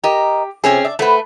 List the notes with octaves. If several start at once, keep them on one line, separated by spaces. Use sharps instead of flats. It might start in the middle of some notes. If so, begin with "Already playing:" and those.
G4 A#4 D#5 A#5
C3 F3 C4 C#4 G#4
D4 E5
A3 A4 B4 C5 F#5